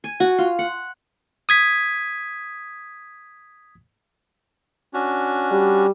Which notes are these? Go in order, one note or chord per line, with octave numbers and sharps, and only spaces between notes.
G#5
F#4
F4
F#5
D#6 G#6 B6
C#4 D4 F#4
G3